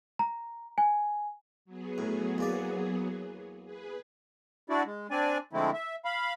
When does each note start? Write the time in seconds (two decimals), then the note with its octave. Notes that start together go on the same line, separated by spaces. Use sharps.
0.19 A#5
0.78 G#5
1.65 F#3 B3 G#4
1.98 A2
2.38 E2 A#3 D5
3.65 G#4 B4
4.70 D4 E4 F#4 D5
4.86 G#3
5.11 C4 D4 D5 G#5
5.53 D3 F3 G#3 A3 C4 E4
5.74 E5
6.05 F5 B5